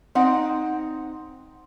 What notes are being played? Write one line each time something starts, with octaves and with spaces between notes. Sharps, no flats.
C4 D#4 F#5